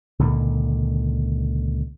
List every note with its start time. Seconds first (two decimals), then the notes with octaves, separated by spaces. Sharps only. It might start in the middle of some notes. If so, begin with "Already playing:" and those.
0.19 C#2 A#2 D3 D#3